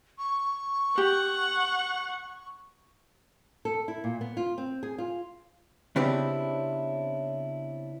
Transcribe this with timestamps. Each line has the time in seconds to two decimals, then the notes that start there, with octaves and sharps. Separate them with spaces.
0.18 C#6
0.98 G4 F#5
3.65 A4
3.88 E4
4.04 A#2
4.21 B3
4.37 F4
4.58 C4
4.83 G#4
4.98 F4
5.96 C#3 B3 C4 D4 E4 G4